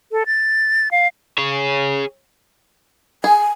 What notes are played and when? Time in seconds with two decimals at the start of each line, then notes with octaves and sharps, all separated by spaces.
0.12 A4
0.26 A6
0.91 F5
1.38 G#4 C#5
3.24 G#4 G#5